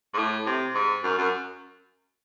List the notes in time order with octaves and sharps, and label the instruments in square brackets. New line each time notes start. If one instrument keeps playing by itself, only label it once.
[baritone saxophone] G#2
A2
C3
G#2
F#2
F#2